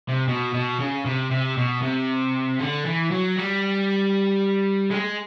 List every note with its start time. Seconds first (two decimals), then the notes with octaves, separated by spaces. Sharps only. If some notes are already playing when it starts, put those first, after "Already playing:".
0.09 C3
0.29 B2
0.54 B2
0.80 C#3
1.06 C3
1.31 C3
1.57 B2
1.83 C3
2.59 D3
2.85 E3
3.11 F#3
3.36 G3
4.91 G#3